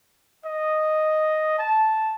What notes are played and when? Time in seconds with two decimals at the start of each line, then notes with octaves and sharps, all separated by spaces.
0.44 D#5
1.58 A5